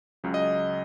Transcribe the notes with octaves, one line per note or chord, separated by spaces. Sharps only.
C#2 C#3 F#3
D#5